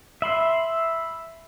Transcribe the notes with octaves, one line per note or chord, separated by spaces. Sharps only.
E5 B5 C6